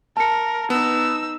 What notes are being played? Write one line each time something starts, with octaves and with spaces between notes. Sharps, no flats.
A#4 A5 C#7
B3 D#4 E6